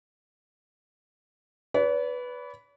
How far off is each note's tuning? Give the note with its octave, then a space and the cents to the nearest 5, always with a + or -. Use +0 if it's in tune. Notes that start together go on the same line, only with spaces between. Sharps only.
B4 +0 D5 -45